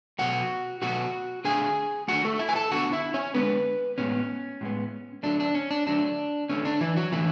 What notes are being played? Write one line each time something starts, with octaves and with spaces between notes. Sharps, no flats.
B2 F#3 A3 F#4 F#5
B2 F#3 A3 F#4 F#5
D3 A3 G#4 G#5
D3 A3 F#4 F#5
A3 A4
E4 E5
G#5
A4 A5
D3 G#3 B3 F#4 F#5
E4 E5
C#4 C#5
D3 G#3 B3 B4
A2 G#3 B3 C#4
A2 G#3 B3
D3 F#3 A3 D4
D4
C#4
D4
D3 F#3 A3 D4
D3 A3 C#4
D4
E3 E4
F#3 F#4
D3 E3 A3 E4